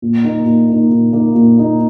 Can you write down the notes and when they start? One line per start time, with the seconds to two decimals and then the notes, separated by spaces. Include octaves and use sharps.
0.02 A#2
0.25 A#3 D#4
0.46 A#2
0.69 A#3 D#4
0.90 A#2
1.13 A#3 D#4
1.35 A#2
1.57 A#3 D#4